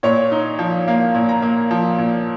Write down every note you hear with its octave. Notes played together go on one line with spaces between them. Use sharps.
A#2 C#5
D#4
F3
A#3 F5
A#2
A#5
A#3
F3
A#2